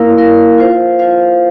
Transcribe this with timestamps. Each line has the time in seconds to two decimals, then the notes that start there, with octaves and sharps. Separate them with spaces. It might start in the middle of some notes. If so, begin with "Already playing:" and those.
Already playing: A#3 E4 A#4 F5
0.18 A#3 E4 A#4 F5
0.58 F4 C5 F5
0.99 F4 C5 F5